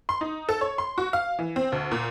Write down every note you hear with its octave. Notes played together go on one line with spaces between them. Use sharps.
C6
D#4
A4
C#5
C6
F#4
F5
E3
C4
D2
A#2